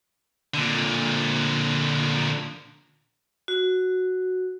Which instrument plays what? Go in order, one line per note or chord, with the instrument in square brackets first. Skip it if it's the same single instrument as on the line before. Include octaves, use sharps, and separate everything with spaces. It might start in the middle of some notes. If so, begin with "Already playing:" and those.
[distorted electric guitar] A#2 D3
[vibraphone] F#4